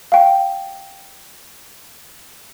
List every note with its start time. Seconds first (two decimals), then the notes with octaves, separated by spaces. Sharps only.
0.12 F5 G5